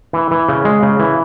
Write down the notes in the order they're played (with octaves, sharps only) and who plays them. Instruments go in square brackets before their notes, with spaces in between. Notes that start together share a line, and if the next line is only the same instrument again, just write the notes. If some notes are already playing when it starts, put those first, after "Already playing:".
[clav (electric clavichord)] E3
E3
C#3
G#3
C#3
E3